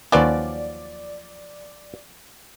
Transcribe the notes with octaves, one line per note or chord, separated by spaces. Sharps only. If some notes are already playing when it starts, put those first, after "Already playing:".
D#2 F3 F#3 C#4 B4 D5